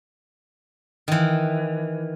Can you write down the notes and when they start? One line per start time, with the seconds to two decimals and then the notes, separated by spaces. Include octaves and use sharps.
1.08 D#3 E3